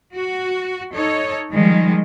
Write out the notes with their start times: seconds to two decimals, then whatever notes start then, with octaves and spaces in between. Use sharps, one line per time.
0.15 F#4
0.95 D#4 A4 C#5
1.52 D#3 F3 G3 G#3